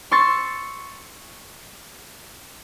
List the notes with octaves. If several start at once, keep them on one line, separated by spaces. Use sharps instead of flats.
C6 C#6 E6 A6